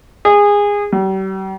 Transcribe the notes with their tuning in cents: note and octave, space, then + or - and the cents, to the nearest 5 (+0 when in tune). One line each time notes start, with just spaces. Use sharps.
G#4 -20
G3 -40